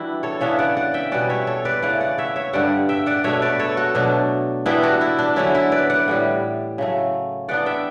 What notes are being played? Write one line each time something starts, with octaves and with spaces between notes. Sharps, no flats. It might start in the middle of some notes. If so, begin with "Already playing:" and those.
Already playing: E3 G3 D4 E4 F#4
A4 C#5
C#3 E3 B3 D4 C#5 E5
D5 F#5
D5 F#5
E5 G5
B2 G3 C#4 D5 F#5
C#5 E5
A4 C#5
B4 D5
C#3 E3 A3 D5 F#5
D5 F#5
C#5 E5
C#5 E5
G2 D3 G3 D5 F#5
E5 G5
D5 F#5
B2 A3 D4 C#5 E5
B4 D5
A4 C#5
F#4 A4
B2 F#3 A3 D4
E3 B3 D4 E4 G4
D4 F#4
E4
D4
D3 F#3 C#4 E4
E4
B4 D5
D5 F#5
A2 E3 G3
C#3 F#3 A3
E3 B3 D4 D5 F#5
E5 G5